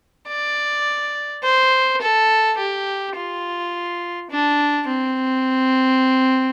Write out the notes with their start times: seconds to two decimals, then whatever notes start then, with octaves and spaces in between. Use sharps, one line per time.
0.29 D5
1.44 C5
2.01 A4
2.58 G4
3.16 F4
4.30 D4
4.88 C4